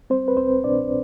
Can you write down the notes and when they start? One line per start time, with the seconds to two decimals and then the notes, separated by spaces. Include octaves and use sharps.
0.10 G3 C4 C5
0.28 B4
0.37 C2 C4 C5
0.64 B2 D4 D5